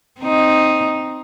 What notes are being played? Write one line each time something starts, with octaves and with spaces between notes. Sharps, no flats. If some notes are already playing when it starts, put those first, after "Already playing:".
C4 D#4